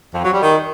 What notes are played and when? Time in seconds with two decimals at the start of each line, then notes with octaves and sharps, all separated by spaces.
0.14 F2
0.23 F#3
0.33 G3
0.42 D#3